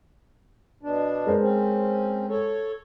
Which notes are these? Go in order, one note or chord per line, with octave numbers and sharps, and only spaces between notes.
B2 D4
G#3 A#4 C5
C4 C#4
A4 C#5